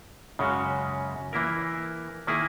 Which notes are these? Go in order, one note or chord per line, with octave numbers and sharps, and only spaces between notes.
F#2 C#3 G#3 C#4 F#4
E3 A#3 E4 A#4
D#3 A#3 E4 G#4